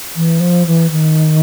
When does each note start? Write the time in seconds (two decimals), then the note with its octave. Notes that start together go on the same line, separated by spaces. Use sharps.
0.16 E3
0.40 F3
0.66 E3
0.91 D#3